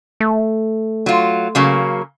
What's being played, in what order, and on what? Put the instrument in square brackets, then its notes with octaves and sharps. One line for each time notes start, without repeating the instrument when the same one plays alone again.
[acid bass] A3
[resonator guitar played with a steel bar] F#3 F4
C#3 F#3 A#3